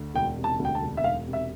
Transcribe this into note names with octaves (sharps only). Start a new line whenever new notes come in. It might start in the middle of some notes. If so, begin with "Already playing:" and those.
Already playing: D2
E1 G5
C3
A5
D2
G5
A5
E1
E5
E1 F5
C3
E5